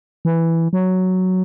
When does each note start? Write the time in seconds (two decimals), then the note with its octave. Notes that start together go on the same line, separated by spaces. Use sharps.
0.25 E3
0.73 F#3